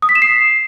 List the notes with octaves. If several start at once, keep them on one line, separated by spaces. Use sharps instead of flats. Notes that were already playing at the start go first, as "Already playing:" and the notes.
D#6
B6
E7
C7